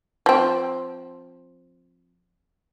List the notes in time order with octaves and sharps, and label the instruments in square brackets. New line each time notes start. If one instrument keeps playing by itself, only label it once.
[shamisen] F3 C4